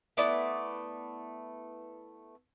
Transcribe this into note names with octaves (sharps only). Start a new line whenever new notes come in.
A3 B3 E4 D5